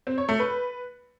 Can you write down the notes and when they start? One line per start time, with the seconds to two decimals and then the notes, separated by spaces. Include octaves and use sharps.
0.07 C4
0.18 C#5
0.29 A3
0.39 B4